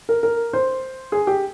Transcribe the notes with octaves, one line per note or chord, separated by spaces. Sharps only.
A#4
A#4
C5
G#4
G4